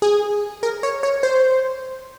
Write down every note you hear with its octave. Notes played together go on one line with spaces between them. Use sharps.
G#4
A#4
C#5
C#5
C5